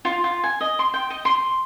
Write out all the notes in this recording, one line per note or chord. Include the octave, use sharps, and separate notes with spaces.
F4
F4
G#5
D#5
C6
G5
D#5
C6